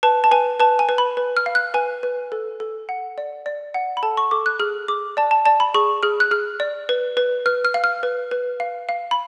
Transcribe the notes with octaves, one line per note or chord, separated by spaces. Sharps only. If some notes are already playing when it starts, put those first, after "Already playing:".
B4 A5
A5
B4 G#5
B4 A5
G#5
B4
B5
B4
F6
F5
F#6
B4 G#5
B4
A4
A4
F#5
D5
D5
F#5
B5
A4 A5
C#6
A4 D6
F#6
G#4 F6
G#4 D6
D5 A5
A5
D5 A5
B5
G#4 C#6
G#4 F6
F#6
G#4 F6
D5
B4
B4
B4 F6
F6
F5
F6
B4
B4
F5
F5
B5